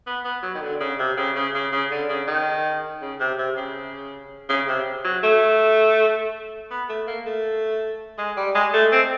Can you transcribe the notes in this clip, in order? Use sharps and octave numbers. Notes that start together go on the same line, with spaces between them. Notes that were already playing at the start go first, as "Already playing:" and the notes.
B3
B3
F#3
D#3
D3
C#3
C3
C#3
C#3
C#3
C#3
D3
C#3
D#3
C#3
C3
C3
C#3
C#3
C3
F#3
A3
B3
A3
A#3
A3
G#3
G3
G#3
A3
C4